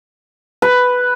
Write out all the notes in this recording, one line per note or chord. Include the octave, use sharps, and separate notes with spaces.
B4